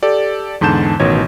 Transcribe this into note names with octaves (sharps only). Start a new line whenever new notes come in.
G4 A4 D5
E2 G#2 D3 A5 G6 E7
A1 B2 D#3 C#5 G#6